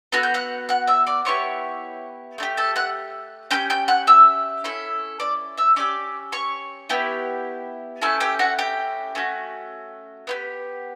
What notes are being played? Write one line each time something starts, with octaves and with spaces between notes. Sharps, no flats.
B3 F#4 A4 F#6
G6
F#5 F#6
F#5 F#6
E5 E6
D5 D6
B3 E4 G4 C#5 C#6
A3 D4 G4
A4 A5
F#5 F#6
C#4 G4 G5 G6
G5 G6
F#5 F#6
E5 E6
C#4 E4 A4
D5 D6
E5 E6
C#4 G4 D5 D6
C#5 C#6
B3 E4 G4
A3 C#4 E4 A4 A5
G4 G5
F#4 F#5
G4 G5
A3 C#4 F#4
B3 E4 G4